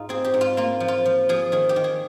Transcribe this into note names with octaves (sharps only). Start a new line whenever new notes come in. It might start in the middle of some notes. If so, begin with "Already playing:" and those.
Already playing: G#2 D#4 F4
C4 G#4
G4
G#2
F4
A#3 F4
F3
F4
F3
F3 G#4
D#3 G#4
G4
D#3
G#4